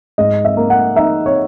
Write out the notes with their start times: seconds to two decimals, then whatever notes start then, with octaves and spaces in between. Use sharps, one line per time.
0.18 G#2 D#5
0.45 E5
0.57 A#3
0.70 F#5
0.96 D#4 E5
1.26 C#5